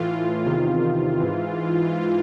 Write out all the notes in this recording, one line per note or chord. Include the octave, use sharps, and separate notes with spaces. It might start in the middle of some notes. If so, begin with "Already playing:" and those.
Already playing: A2 E3 F4
E2 C3 D#3 F4
G#2 E3